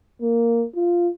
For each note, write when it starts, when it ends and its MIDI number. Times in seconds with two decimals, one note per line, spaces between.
0.22 0.65 58
0.75 1.09 65